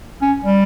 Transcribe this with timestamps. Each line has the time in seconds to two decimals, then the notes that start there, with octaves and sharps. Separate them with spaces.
0.22 C#4
0.43 G3